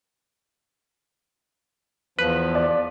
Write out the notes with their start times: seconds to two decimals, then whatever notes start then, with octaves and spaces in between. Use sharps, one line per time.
2.19 E2 F3 B4
2.55 D5